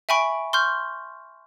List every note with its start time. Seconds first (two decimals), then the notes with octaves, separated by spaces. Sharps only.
0.09 E5 G5 G#5 B5 C#6 D7
0.53 C6 C#6 F6 G6